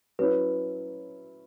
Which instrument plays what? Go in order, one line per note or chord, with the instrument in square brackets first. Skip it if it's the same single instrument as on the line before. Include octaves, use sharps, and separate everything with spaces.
[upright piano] F#3 C#4 E4 [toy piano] B4